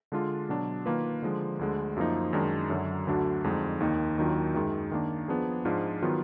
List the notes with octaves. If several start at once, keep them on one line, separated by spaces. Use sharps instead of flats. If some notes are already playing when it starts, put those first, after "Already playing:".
D3 G#3 D4 F4
B2 F#3 D4
D#3 A#3 F4 B4
D3 F3 G#3
D2 D3 G#3
F#2 F3 A#3 D#4
F#2 D#3 G#3 D4
F#2 D3 F#3
D2 D3 F#3 D4 F#4
F2 D3 G#3 D#4
D#2 D#3 A#3 D#4
D#2 D#3 F#3 D4 F4
F#2 D#3 G#3
D#3 A#3 D4
F3 B3 D4 G#4
G#2 F3 G#3 D4 F4
D#3 F#3 B3 F4